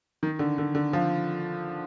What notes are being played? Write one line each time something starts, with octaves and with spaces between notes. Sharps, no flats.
D#3
D3
D3
D3
F3